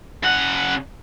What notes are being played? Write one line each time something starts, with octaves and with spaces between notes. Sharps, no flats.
C#3 F#5